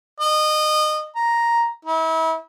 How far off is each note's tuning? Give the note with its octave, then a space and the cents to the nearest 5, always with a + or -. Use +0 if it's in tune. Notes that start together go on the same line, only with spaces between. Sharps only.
D#5 -25
A#5 +5
E4 -35